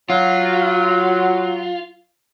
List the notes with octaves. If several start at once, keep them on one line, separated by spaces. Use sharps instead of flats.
F#3 F4